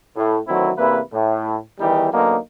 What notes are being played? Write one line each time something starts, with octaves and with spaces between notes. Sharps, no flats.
A2
D2 D#3 F#3 C4 E4
E2 C3 A#3 E4 B4
A2
E2 D#3 E3 G3 D#4 G4
D3 F#3 A#3 B3 C#4 D#4